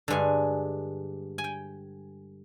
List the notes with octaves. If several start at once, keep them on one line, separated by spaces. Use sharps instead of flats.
G2 D3 G#3 G#5
G#5
G5